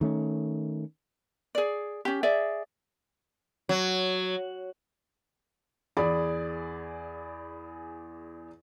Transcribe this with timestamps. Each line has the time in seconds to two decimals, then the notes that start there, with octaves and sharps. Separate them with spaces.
0.01 D#3 A3 C#4
1.55 G#4 D5
2.05 C#4 G4
2.23 G#4 D5 E5
3.69 F#3
5.97 E2 G#4 D5 G#5 B5